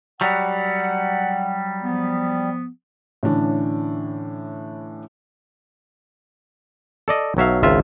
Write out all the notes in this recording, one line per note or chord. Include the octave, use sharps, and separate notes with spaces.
F#3 G3 F#5
F3 B3
A2 D3 E3 C#4 D4
A4 D5 D#5
B1 F#3 E5 F5
G#1 C#2 F4 E5